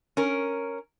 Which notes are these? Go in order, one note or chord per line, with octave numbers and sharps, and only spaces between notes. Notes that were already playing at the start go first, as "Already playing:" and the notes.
C#4 A#4